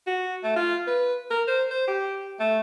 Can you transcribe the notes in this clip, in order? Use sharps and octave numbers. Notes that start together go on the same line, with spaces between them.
F#4
A3
F4
B4
A#4
C5
C5
G4
A3